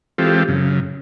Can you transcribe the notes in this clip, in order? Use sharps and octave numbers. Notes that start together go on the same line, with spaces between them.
E3 G#3 C4 F4 G4 A4
F#2 C#3